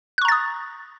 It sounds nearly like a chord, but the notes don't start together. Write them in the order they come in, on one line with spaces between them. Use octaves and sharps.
F#6 C#6 A#5 A6 D#6